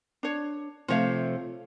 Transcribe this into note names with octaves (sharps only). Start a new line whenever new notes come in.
D4 C#5
C3 F3 A3 F4 C#5 F5